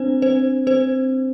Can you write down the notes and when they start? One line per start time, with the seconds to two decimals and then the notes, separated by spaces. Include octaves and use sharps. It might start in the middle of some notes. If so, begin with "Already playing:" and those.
Already playing: C4 D4 C5
0.22 C4 C5
0.67 C4 C5